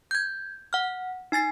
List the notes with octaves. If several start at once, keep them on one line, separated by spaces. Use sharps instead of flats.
G6 G#6
F#5 F6
D#4 G#5 A6 C7